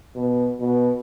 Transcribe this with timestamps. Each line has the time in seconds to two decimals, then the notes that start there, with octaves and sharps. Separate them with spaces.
0.16 B2
0.60 B2